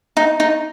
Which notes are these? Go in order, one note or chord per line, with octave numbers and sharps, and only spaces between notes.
D#4
D#4